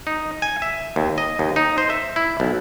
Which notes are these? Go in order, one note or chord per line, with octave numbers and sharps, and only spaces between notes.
D#4
G#5
E5
D#2
D#5
D#2
D#4
C5
E5
E4
B1